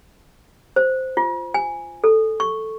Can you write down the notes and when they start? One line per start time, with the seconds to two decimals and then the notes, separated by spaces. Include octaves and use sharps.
0.76 C5
1.17 F4
1.54 G#5
2.04 A4
2.40 C#6